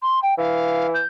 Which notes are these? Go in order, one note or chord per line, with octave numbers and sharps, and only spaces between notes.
C6
G5
E3 F5
G6